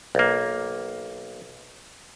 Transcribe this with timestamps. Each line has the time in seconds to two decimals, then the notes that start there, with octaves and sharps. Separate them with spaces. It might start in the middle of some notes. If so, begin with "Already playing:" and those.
0.15 B1 A#3